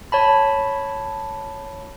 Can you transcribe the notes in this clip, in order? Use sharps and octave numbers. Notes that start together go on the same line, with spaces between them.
C#5 A5 B5